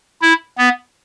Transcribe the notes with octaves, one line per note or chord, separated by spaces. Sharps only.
E4
B3